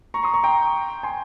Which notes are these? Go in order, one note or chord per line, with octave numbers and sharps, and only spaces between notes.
A#5 C#6
C6 D#6
A#5 C#6
G5 A#5
G#5 C6